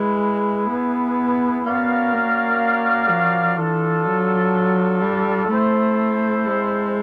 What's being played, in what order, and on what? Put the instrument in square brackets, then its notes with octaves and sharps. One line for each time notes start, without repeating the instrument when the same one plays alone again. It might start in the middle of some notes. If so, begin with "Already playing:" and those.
Already playing: [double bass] G#3 [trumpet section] E4 G#4 B4
[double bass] B3
[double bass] B3 [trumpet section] C#4 F#4 A#4 D5 F5
[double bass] A#3
F3
[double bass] E3 [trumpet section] D4 F4 A4
[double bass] F#3
G3
[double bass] A3 [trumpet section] C4 E4 A4 C5
[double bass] G#3